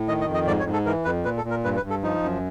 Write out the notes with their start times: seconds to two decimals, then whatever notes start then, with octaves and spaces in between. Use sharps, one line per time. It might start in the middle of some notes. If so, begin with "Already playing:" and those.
Already playing: A2
0.08 D#3 D#5
0.21 D#5
0.28 F2
0.34 D#5
0.47 G#2 D5
0.60 C#5
0.66 G#2
0.73 A4
0.86 E3 A#4
1.05 F2 B4
1.25 A#2 B4
1.37 A4
1.44 A#2
1.50 A#4
1.64 G2 B4
1.76 B4
1.83 G2
1.90 A4
2.03 F3 D#4
2.23 F#2